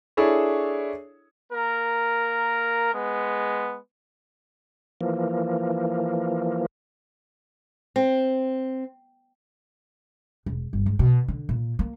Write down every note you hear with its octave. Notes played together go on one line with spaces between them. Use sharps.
D4 E4 G#4 A4 C#5
A#3 A#4
G#3 B3
E3 F3 A#3
C4
E1
G1
G#2
B2
D3
A#2
A#3